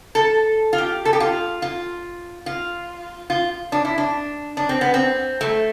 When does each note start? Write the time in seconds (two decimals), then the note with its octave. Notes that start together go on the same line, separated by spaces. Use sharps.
0.15 A4
0.73 F4
0.78 G4
1.05 A4
1.13 G4
1.20 F4
1.62 F4
2.46 F4
3.30 F4
3.72 D4
3.85 E4
3.98 D4
4.57 D4
4.69 C4
4.81 B3
4.94 C4
5.41 A3